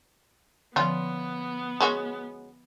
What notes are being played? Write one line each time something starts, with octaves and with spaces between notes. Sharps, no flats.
D3 F3 B3 C#4 F4
G#3 C#4 F#4